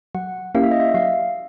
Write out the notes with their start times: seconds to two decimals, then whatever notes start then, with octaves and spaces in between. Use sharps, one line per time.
0.15 F#3 F#5
0.55 A#3 C#4 E4 G4 F5
0.63 E5
0.71 D#5
0.80 E5
0.94 F#3 F5